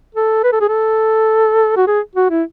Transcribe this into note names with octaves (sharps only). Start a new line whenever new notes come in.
A4
B4
A4
G#4
A4
F#4
G#4
F#4
E4